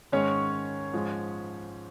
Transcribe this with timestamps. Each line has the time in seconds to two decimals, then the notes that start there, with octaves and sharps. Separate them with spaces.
0.12 G#2 D#3 G#3 C#4 C#5
0.93 G#2 F3 G#3